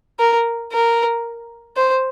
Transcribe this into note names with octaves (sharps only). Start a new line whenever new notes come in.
A#4
A#4
C5